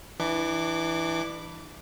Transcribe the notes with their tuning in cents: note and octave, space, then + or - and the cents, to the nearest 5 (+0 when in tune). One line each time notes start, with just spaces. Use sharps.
E3 +0 D4 +35 D6 -20